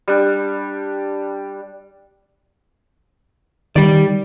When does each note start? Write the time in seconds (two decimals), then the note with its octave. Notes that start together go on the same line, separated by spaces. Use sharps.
0.08 G3 D4
3.76 D#3 G3 D5